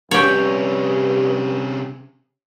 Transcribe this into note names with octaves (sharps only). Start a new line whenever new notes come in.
G2 C3 C#4 G4 C#5